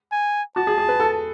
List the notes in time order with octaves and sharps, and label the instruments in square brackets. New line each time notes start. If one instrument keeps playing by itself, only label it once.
[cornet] G#5
[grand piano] F#4 [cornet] A5
[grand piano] G#4
G#4
B4
A4